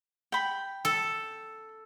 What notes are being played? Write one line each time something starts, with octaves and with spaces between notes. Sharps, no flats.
G5 B5
A4